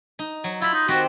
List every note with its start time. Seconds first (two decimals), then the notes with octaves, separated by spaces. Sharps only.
0.19 D#4
0.44 F#3
0.62 E4 F4 B5
0.73 D#4
0.88 D#3 C4 F#4 G4